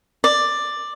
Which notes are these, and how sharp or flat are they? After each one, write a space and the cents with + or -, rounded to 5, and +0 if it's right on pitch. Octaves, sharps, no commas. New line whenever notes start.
D5 +10